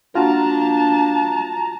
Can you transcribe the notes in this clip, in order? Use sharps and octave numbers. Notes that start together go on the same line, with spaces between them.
G3 A#3 D4 F4 F#4 A5 A#5